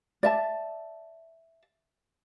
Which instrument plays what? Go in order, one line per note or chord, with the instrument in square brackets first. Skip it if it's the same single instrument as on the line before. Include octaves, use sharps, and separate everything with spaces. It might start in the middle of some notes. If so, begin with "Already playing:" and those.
[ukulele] D5 E5 A5